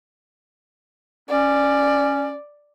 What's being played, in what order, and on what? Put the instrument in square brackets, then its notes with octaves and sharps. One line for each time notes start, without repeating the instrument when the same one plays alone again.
[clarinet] C#4 [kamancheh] D5